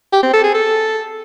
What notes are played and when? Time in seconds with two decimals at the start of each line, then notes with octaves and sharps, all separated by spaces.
0.12 G4
0.23 C4
0.33 A4
0.44 G#4
0.54 A4